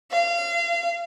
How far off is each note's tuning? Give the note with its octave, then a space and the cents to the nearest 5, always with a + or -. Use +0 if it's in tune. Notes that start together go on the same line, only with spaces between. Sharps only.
F5 -30